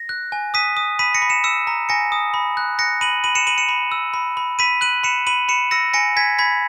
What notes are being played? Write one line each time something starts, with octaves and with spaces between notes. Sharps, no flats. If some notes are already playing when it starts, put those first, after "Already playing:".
Already playing: A#6
F#6
G#5
D#6 B6 D#7
D#6
B5 B6 D#7
A#6 C#7
B5
C#7 E7
E6 C#7 E7
A#5
G#5 A#6 C#7
D#6
B5
F#6
F#6 A#6 C#7
B5 D#7 F#7
B5 D#7 F#7
C#7 E7
B5 D#7 F#7
C#7 E7
B5
E6
B5
B5
B5 B6 D#7
F#6 D#7 F#7
B5 C#7 E7
B5 D#7 F#7
B5 C#7 E7
E6 A#6 C#7
G#5 A#6 C#7
G#5 G#6 B6
B5 G#6 B6